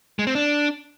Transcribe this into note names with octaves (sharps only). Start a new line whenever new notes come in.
G#3
C4
D4